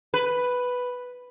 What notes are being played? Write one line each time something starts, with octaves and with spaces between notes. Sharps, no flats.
B4